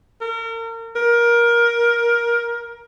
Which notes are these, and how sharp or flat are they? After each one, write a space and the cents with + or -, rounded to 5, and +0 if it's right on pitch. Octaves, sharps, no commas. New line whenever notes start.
A#4 -35
A#4 +20